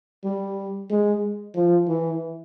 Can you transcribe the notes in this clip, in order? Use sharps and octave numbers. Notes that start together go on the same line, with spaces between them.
G3
G#3
F3
E3